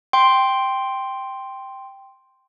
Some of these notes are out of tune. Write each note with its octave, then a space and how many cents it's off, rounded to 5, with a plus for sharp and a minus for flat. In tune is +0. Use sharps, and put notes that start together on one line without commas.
G5 +0 C6 +0